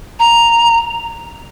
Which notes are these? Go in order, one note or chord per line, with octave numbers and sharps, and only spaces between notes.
A#5